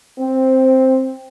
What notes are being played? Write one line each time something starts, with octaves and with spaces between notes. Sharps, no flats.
C4